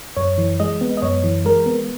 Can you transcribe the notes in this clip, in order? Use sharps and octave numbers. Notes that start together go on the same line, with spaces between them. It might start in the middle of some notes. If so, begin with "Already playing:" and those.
F#2 C#5
E3
G#3 D#5
B3
D#5
F#2 C#5
E3
G#3 A#4
B3